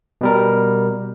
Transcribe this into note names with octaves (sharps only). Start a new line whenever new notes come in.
B2 G3 A#4